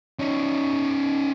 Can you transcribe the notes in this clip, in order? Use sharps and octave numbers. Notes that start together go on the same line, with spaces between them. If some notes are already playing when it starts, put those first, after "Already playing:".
C#4 D#4